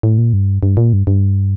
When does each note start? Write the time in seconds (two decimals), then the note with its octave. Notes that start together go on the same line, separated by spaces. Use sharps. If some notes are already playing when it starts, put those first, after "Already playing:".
0.03 A2
0.18 A#2
0.33 G2
0.63 G2
0.77 A#2
0.93 G2
1.07 G2